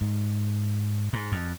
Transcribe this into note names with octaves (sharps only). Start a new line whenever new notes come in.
G#2
G#2
F2